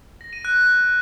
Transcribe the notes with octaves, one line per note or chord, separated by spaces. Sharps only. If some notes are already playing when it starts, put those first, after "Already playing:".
A#6
D#7
F#6